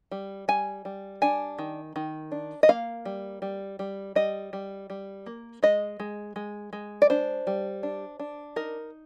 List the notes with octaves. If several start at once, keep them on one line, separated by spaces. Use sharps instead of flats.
G3
G3 G#5
G3
D4 G#5
D#3
D#3
D4
D#5
A#3 F5
G3
G3
G3
G3 D#5
G3
G3
A#3
G#3 D#5
G#3
G#3
G#3
D5
D4 C5
G3
D4
D4
D#4 A#4